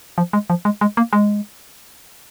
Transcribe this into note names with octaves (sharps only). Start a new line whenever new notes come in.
F3
G#3
F3
G#3
G#3
A#3
G#3